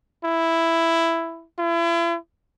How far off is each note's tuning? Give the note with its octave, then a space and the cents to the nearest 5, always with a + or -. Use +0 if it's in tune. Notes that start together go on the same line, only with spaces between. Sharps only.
E4 +5
E4 +40